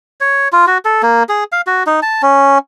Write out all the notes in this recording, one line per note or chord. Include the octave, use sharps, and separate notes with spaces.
C#5
F4
F#4
A4
A#3
G#4
F5
F#4
D#4
A5
C#4